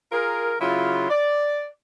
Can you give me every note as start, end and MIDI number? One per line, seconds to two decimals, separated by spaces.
0.11 0.55 65
0.11 0.55 68
0.11 0.55 70
0.60 1.05 49
0.60 1.05 54
0.60 1.05 64
0.60 1.05 65
1.10 1.68 74